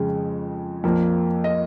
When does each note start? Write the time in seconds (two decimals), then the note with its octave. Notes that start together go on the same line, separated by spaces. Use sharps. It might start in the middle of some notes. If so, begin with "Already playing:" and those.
Already playing: F2 C#3 G#3
0.84 F2 F3 A#3
1.44 D#5